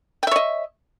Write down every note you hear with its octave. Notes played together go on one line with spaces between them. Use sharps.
C#5 D#5 E5 G5